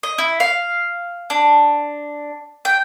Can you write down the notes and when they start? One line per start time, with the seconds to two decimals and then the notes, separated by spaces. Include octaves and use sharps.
0.03 D#5
0.18 E4
0.40 F5
1.30 D4
2.65 G5